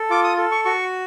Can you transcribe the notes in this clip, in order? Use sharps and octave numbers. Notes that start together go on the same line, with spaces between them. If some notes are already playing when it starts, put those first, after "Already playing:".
Already playing: A4
F4 D6
D#6
A4
C#6
F#4 C#6